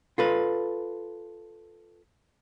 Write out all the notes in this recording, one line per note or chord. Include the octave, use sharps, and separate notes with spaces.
F4 A4 B4